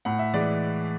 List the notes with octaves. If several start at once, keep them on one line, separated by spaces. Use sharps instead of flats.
A2 F#5
E5
E3 G#3 D5